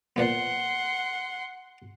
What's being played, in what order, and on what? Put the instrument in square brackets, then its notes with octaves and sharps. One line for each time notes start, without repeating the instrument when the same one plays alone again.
[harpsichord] A#2 F3 B3 [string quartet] F#5 C6